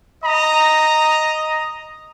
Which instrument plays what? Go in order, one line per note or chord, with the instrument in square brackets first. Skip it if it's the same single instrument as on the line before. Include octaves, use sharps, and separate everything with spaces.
[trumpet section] D#5 A#5